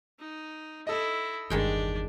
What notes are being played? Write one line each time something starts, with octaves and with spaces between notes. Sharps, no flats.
D#4
E4 A4 D#5
G1 E2 D#3 G#3 D4 G4 G5